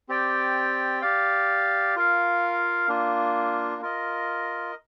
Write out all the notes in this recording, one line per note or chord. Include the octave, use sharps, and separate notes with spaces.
C4 G4 D5 G5
G4 D5 F5
F4 A#4 F5
A#3 D4 F4
F4 A#4 D#5